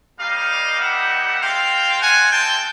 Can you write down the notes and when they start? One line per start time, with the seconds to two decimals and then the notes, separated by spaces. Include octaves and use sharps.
0.19 G3 A#3 D#4 G4 D#5 F5
0.79 E5 F#5
1.41 G#3 C4 F4 F5 G5
2.01 F#5 G#5
2.32 G5 A5